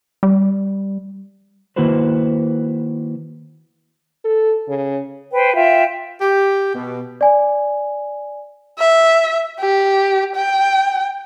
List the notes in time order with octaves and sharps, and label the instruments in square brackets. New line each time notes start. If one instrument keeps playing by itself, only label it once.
[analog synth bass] G3
[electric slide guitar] D#3 A#3 E4 F#4 B4 C5
[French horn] A4
C#3
[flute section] B4 C5 G5
F4 E5 G5
[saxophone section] G4
B2
[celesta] D5 G#5
[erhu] E5
G4
G5